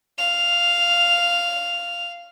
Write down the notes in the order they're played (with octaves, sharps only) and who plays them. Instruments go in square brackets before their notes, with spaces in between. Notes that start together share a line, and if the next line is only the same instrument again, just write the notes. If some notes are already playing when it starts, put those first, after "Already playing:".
[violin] F5 F7